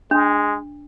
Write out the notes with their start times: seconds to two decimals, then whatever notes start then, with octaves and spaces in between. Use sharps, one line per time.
0.11 G#3 D4